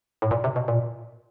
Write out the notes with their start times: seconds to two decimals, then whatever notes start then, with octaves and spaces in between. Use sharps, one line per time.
0.22 A2
0.31 A#2
0.44 C3
0.56 B2
0.68 A#2